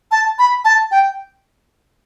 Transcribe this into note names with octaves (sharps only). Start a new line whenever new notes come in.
A5
B5
A5
G5